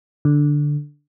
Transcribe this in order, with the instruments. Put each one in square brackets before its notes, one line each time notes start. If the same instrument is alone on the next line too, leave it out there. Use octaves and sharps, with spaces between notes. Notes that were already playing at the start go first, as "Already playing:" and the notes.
[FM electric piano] D3